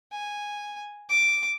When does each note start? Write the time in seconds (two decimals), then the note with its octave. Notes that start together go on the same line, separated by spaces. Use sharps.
0.12 G#5
1.09 D6